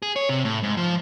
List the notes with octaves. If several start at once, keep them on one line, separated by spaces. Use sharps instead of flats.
G#4
C#5
C3
A2
G#2
F3